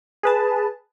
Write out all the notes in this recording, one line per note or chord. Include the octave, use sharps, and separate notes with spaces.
G#4 B4 A5